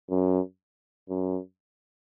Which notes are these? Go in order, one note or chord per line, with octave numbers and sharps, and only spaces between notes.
F#2
F#2